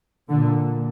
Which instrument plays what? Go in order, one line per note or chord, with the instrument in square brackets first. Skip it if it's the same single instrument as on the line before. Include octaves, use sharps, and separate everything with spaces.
[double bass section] A#2 D3